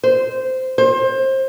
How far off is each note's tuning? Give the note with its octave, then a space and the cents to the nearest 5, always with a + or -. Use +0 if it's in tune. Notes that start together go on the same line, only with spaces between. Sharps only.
C5 -10
C5 +25